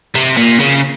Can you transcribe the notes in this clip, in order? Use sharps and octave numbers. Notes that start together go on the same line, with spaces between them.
C3
A#2
C#3